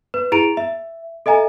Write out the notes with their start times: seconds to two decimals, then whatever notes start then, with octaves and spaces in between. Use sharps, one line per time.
0.14 B4
0.32 E4 G#4 A#5 D7 F7
0.57 E5
1.26 A4 D#5 E5 G#5 A#5